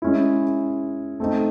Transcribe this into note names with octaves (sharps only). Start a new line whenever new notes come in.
G#3 C#4 E4
A3 C4 D#4